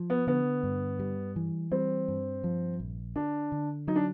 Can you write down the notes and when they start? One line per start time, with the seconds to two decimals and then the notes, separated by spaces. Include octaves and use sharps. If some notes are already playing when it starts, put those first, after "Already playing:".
Already playing: F3
0.10 B3
0.27 D3 B3
0.63 G2
0.99 G3
1.36 E3
1.72 G3 C4
2.08 G2
2.44 F3
2.80 A#1
3.16 D3 D4
3.52 D3
3.87 F#3 D#4
3.96 D4